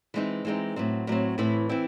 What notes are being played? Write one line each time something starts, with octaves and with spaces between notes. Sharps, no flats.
E3 G#3 C4 D#4
E3 G#3 C4 D#4
A2 F#3 C4
A2 F#3 C4
A2 E3 C4 E4
E3 C4 E4